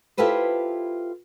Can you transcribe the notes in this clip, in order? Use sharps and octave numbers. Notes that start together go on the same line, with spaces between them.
E4 F4 G4 A4 B4 C5